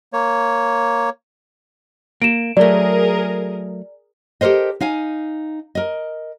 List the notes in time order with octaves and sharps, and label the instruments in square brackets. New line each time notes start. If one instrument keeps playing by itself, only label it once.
[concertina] A#3 C#5
[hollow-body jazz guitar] A#3 [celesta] D7 E7
[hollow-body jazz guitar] F#3 A3 [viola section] G#4 A#4 [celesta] D5
[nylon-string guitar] G4 A4 A#4 C5 D#5
D#4 F5 G#5
A#4 D#5